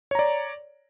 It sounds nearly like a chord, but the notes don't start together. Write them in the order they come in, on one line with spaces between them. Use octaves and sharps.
C#5 A#5 D5